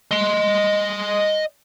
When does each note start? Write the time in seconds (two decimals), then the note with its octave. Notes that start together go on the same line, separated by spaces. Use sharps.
0.11 D#5 C6